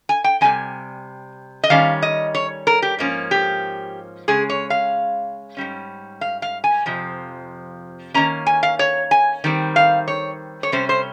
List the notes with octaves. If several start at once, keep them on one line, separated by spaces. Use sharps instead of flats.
G#5
G5
F2 C3 G3 G#5
D#5
D#3 G3 C#4 F5
D#5
C#5
A#4
G4
G#2 F3 A#3 C#4
G4
C#3 G#3 C#4 G#4
C#5
F5
G#2 G3 C#4
F5
F5
G#5
F2 C3 F3
D#3 A#3 C#4 A#5
G#5
F5
C#5
G#5
D#3 G3 C4
F5
C#5
C#5
C3 G3 C#4 C5
C5